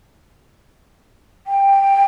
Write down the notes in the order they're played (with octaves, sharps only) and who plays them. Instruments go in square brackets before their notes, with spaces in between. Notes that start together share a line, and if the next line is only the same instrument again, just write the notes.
[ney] G5